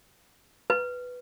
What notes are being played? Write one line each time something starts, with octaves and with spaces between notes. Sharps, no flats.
B4